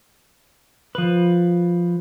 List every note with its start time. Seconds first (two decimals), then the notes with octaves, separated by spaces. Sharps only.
0.95 F3 B4